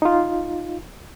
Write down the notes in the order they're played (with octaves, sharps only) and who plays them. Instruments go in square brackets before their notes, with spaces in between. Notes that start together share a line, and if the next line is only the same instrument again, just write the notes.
[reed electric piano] D#4 F4